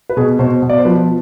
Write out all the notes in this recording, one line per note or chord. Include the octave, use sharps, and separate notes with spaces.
B4
B2 G#4
B2 C5
B2
D5
C5
F3 B4